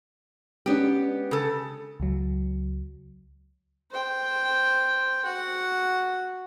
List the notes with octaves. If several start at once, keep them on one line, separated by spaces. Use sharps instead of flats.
G#3 B3 C#4 D4 G4
C#3 A4
C#2 F#3
C5 G5
F#4 F#5